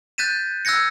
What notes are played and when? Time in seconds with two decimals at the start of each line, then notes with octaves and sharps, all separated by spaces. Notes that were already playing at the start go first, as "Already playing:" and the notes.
0.18 F#6 G6 A6 B6 D#7 E7
0.65 E6 F#6 G#6 A#6 C#7